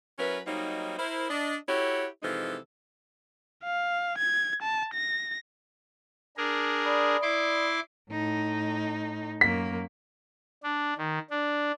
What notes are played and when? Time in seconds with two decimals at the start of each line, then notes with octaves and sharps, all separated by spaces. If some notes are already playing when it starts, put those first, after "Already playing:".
0.18 F#3 C#4 E4 A#4 B4
0.47 F#3 G3 A#3 C4 D#4
0.99 E4 A#4 C5
1.29 D4 D#5
1.68 E4 F#4 G4 A4 C#5
2.22 C3 E3 F3 G#3 D#4 A4
3.64 F5
4.18 G#6
4.63 A5
4.94 A#6
6.37 D4 G#4 A#4
6.83 D5 B5 D#6
7.22 E4 C6 D6
8.10 A2 D#4
9.41 F#2 A#3 B6
10.63 D4
10.98 D#3
11.31 D4